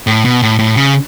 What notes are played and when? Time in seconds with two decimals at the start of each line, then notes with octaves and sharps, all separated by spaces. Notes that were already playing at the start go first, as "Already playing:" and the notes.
0.07 A2
0.25 B2
0.42 A2
0.59 A2
0.76 C#3